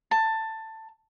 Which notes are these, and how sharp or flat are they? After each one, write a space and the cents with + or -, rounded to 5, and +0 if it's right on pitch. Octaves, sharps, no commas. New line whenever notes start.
A5 +15